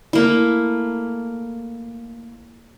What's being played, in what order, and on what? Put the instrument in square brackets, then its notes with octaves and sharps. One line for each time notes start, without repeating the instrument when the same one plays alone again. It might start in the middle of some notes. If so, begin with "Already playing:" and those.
[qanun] A3 A#3 E4